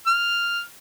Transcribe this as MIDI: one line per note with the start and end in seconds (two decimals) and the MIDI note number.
0.07 0.60 89